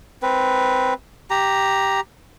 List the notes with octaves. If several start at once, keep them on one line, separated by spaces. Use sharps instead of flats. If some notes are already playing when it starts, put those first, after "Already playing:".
C4 B4
G4 A#5